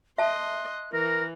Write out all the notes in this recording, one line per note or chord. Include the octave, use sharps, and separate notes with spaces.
D#5 E5 A5 C6 F#6
E3 A#4 A#6